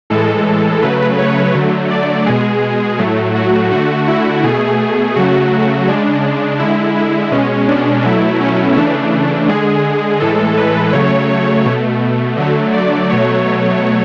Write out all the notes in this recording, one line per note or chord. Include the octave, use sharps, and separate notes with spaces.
A2 E3 G#3 A4
C#3 F#3 A3 B4
C#5
D3 F#3 A3
D5
B2 G#3 G#4
A2 F#3 A3
F#4
D3 A3 F#4
E4
B2 A3 G#4
C#3 F#3 A3 F#4
C#3 G#3 D4
D3 G#3 E4
E4
B2 G#3 C#4
D4
B2 F#3 A3 E4
C#4
C#3 E3 A3 D4
D3 G#3 G#4
A2 E3 G#3 A4
B4
C#3 F#3 A3 C#5
C#5
B2 A3
D3 F#3 A3
D5
B2 F#3 A3 C#5